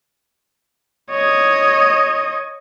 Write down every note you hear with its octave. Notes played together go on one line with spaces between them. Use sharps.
C#5 D#5